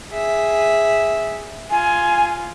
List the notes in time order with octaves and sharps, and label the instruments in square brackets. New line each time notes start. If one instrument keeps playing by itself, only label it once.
[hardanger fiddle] G#4 E5
[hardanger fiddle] F4 [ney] G#5